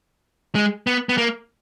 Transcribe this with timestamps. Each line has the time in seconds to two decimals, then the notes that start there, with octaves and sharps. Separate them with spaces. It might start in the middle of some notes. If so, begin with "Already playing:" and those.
0.55 G#3
0.87 B3
1.09 B3
1.18 A#3